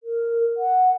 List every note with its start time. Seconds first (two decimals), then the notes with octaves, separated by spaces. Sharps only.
0.03 A#4
0.57 F#5